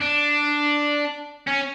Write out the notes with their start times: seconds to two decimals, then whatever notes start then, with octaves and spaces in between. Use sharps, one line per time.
0.01 D4
1.47 C#4